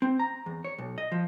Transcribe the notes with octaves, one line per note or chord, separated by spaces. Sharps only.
C4
A#5
E2
C#5
B1
D#5
F3